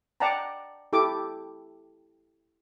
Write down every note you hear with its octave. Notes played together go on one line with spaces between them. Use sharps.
D5 F#5 G5 A5 A#5
E4 G4 A4 D6